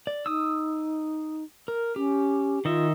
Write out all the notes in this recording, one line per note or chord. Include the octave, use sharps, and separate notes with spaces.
D5
D#4 D#6 E6
A#4
C#4 G4
D#3 F4 D#5 E5